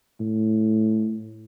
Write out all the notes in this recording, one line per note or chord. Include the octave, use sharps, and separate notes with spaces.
A2